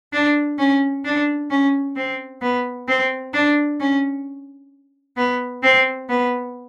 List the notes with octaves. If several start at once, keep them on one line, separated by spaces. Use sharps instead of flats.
D4
C#4
D4
C#4
C4
B3
C4
D4
C#4
B3
C4
B3